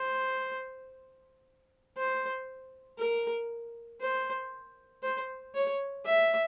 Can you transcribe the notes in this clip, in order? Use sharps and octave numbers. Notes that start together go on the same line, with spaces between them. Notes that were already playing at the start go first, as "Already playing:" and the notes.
Already playing: C5
C5
A#4
C5
C5
C#5
E5